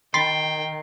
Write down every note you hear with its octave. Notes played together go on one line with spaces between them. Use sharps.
D#3 G5 B5 C6 A6 C7